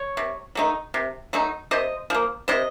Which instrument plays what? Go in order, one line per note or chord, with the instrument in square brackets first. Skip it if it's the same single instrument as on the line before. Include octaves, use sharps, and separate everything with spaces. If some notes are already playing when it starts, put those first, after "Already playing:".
Already playing: [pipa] C#5
C3
F#3 A3 D#4
C3
F#3 A3 D#4
C3 C5 D#5
F3 A#3
C3 C5 D#5